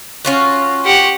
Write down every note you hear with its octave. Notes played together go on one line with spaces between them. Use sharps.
C#4 F4 F#4
G4 F#5